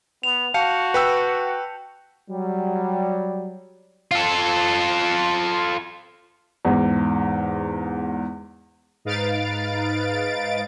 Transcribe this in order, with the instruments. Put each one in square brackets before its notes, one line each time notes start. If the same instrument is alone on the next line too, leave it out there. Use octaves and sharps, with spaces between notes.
[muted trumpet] B3 [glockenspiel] F7
[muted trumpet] F#4 [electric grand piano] F5 [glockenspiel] A5 G6 C#7
[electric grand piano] B4 G5 E6
[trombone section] F#3 G3
[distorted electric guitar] F4 A4
[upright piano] E2 G#2
[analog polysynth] G#2 D#4 B4 F5 A6 D7